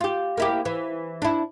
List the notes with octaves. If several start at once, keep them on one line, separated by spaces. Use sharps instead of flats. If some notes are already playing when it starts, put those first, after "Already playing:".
F4 G4
A#3 E4 G4
E3
D4 E4